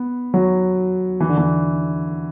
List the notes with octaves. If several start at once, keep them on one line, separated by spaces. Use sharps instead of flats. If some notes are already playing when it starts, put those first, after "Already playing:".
Already playing: B3
F#3
E3
D3
E3